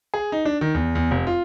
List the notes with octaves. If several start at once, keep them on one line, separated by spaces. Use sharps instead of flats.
G#4
D#4
D4
D#3
E2
E2
F1
F4